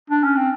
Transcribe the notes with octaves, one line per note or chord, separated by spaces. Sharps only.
D4
C#4
C4